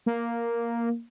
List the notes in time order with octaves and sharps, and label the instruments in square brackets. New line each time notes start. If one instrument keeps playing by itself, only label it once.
[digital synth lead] A#3